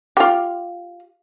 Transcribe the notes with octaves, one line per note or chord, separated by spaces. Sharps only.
F4 G4